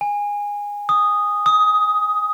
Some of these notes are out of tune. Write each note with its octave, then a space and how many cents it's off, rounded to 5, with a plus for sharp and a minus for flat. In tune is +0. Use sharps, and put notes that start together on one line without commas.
G#5 -20
D#6 -5
D#6 +15